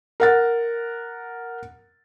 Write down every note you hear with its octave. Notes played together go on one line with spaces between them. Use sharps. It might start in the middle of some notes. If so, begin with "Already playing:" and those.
A#4 F#5 A6